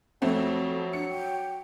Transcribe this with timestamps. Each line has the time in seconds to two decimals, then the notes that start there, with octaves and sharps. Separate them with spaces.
0.22 F2 F#3 A3 C4
0.93 D4 C#7
1.09 G5